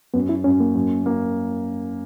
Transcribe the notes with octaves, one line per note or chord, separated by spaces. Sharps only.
F#2 B3
E4
F#2 C#4
A#3
F#2
A#3